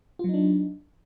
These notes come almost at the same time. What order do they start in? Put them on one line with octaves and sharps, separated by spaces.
F4 F#3 D#4 D4